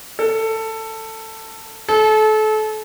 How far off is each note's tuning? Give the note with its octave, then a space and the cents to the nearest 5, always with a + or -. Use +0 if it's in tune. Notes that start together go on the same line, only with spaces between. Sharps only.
A4 +15
A4 -30